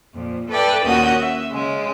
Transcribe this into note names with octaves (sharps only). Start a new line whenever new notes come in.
F2 A#2
A4 B4 D5 E5 G5
D#2 A#2 C#4 F#4 D#6 G6
E5
C#3 G#3